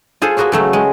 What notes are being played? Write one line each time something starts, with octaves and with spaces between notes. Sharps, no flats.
F4 G#4 A4 C5
A#3 B3 F#4 G#4 C#5
C#3 F#3 A3
G#3